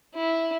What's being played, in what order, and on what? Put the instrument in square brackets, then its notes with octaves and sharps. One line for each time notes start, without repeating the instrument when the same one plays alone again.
[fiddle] E4